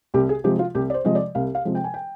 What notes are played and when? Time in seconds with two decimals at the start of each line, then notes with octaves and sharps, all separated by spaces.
0.14 C2 G4
0.29 G#4
0.44 C3 F3 G#3 G4
0.59 F4
0.75 C2 G4
0.90 D5
0.94 C5
1.04 C3 F3 G#3 D#5
1.15 D5
1.35 C2 F5
1.55 F5
1.65 C3 F3 G#3
1.75 G5
1.84 G#5
1.94 G5